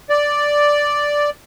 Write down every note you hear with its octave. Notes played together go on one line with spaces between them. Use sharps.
D5